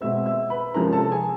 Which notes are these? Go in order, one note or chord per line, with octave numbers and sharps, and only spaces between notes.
B2 G#3 C4 E5 E6
E5 E6
B4 B5
C3 F3 G#3 C#4 A#4 A#5
A4 A5
G#4 G#5